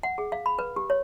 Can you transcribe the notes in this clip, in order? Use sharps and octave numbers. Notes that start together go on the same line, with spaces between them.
F#5
G#4
F5
B5
B4
G4
C#5